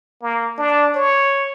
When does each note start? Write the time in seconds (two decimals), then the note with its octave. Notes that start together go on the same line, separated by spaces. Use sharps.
0.22 A#3
0.58 D4
0.95 C#5